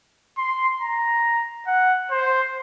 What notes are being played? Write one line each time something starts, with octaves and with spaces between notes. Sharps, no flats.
C6
A#5
F#5
C5